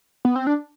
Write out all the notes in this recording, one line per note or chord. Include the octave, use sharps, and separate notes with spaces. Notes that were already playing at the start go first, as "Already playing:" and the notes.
B3
C4
D4